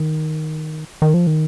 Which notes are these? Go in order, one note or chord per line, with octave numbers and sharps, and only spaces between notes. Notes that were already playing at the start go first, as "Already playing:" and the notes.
Already playing: D#3
D#3
F3
D#3